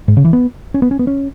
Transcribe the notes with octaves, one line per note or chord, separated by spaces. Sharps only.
G#2
C#3
E3
B3
C#4
B3
C#4
B3
C#4